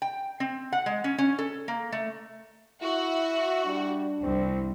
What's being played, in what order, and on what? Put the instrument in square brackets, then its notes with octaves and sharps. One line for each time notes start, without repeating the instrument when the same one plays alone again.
[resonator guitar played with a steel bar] G5
C4
F#5
G#3
C#4
C#4
A4
A#3
A3
[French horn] E4 [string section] F#4 [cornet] E5
[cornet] G3 [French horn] D4
[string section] C2 [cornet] C4